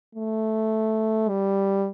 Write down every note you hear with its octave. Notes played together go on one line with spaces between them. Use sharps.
A3
G3